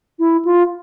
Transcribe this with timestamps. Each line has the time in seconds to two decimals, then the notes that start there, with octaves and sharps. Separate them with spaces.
0.19 E4
0.45 F4